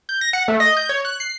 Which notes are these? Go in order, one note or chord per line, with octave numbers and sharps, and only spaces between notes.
G6
A#6
F#5
A3
D#5
G6
C#5
F#6
C7